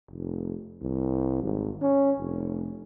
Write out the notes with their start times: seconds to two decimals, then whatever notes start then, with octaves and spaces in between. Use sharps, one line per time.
0.11 F1
0.81 C2
1.43 G#1
1.81 C#4
2.19 F1